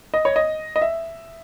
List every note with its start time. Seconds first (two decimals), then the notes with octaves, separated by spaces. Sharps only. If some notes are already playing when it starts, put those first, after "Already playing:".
0.14 D#5
0.25 C#5
0.36 D#5
0.76 D#5
0.82 E5